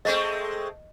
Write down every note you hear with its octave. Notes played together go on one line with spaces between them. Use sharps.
G#3 A3 C4 D#5